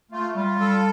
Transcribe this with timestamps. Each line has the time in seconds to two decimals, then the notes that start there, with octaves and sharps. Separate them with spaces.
0.12 A3 F4
0.36 G3 F4
0.60 G3 A4